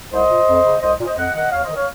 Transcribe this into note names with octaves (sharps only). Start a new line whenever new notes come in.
C2 C5 D#5
A#2
F2
C#3
C2 C5 D#5
A#2
C5 D#5
F2 D#5 F#5
D#3 D#5 F#5
D#2 C#5 F5
C5 D#5
D#3
C#5 F5